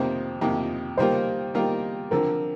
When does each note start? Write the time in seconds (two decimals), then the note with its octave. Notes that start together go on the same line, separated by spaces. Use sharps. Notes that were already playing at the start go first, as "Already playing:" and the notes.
Already playing: F2 C3 D#3 A#3 C5
0.41 F2 C3 D#3 A#3
0.97 D#3 G3 A#3 F4 A#4 C5
1.54 D#3 G3 A#3 F4 A#4
2.11 D3 F3 C4 A#4